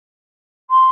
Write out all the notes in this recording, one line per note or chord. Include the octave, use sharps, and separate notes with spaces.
C6